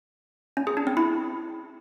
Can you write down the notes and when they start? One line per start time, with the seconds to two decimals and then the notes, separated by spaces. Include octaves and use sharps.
0.57 C#4
0.67 G#4
0.77 D4
0.87 C4
0.97 E4